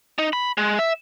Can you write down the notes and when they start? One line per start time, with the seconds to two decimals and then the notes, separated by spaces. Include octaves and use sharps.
0.18 D#4
0.33 B5
0.58 G#3
0.79 E5